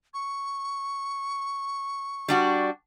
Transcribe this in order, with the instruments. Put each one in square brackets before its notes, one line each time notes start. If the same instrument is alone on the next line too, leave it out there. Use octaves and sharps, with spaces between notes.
[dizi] C#6
[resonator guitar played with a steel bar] G3 D4 F#4